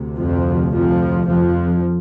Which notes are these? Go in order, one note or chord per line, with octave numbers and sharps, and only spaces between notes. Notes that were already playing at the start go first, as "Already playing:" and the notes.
Already playing: D2 C3
F2 F3
F2 F3
F2 F3